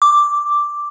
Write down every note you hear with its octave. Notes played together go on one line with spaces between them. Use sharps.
D6